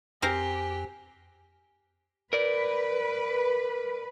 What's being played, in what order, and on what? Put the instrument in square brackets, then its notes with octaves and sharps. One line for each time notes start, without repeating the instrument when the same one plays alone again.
[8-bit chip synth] F2 [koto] C4 A#4 C5 [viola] G4 [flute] G#5
[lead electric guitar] A#4 D5 [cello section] B4